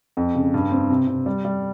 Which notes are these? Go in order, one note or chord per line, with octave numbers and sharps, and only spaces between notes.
F2
C#3
G2
C4
C3
C3
G3
G3